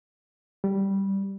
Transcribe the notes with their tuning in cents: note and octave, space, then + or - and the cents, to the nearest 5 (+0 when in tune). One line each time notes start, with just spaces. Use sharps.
G3 -5